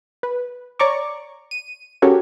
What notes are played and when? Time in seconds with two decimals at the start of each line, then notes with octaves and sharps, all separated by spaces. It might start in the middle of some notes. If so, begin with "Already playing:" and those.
0.23 B4
0.79 C#5 D5 A#5 C#6 D6
1.51 D#7
2.02 C#4 F#4 G4 A4 A#4 C#5